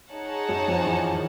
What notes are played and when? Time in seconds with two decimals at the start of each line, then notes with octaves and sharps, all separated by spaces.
0.11 D#4 G#4 C#5 F#5 A5
0.49 F#2 F#3
0.68 F2 F3
0.87 E3
1.13 D#3